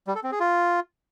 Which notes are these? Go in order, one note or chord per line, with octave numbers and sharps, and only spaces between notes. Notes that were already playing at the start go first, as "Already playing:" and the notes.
G3
A4
C4
G#4
F4